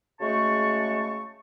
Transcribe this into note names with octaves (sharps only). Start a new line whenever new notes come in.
C#3 G#3 A3 F#4 A5 C#6